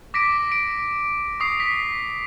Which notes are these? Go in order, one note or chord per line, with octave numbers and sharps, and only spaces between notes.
D6 A#6 B6 D7
D7
C#6 D#6 C7
B6